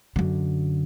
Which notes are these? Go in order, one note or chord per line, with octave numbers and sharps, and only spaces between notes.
F#2 D3